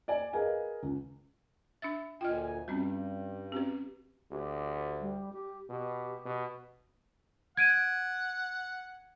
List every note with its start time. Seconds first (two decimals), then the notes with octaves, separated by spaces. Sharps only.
0.08 D5 G#5
0.33 G#4 A#4 B4 D#5 F5 G#5
0.83 C#2
1.82 D4 E5 E6 A6
2.21 D2 A#2 F4 D#5 G5 G#5 F6
2.68 G2 G3 C4 C#4 F#4
3.52 C4 C#4 F#4 G4 B4
4.31 D2 G4
5.01 G3
5.33 G4
5.70 B2 G4
6.25 B2
7.57 F#5 G#6 D7 D#7